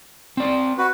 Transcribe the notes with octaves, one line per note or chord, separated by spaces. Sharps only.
C4 D5
F#4 B4